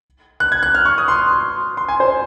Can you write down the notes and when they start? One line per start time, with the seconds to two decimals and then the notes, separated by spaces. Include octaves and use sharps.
0.40 F#6
0.52 G#6
0.63 F#6
0.75 F6
0.85 C#6
0.98 D#6
1.08 C6
1.77 C6
1.89 G#5
2.00 C5